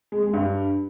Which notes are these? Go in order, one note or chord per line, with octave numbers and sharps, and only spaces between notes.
G#3
G#3
G2